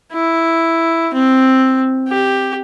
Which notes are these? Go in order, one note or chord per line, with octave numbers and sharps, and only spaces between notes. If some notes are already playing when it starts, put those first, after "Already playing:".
E4
C4
G4